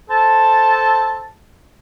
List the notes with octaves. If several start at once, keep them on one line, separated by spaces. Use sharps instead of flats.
A4 C5 A5